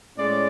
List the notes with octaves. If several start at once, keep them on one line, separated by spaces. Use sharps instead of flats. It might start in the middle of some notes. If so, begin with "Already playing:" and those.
A2 G#3 C#4 D5